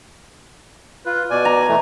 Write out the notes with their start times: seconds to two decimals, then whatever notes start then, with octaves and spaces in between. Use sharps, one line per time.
1.06 F4 B4
1.31 B2 D5 G#5
1.45 A#5
1.68 E3 A3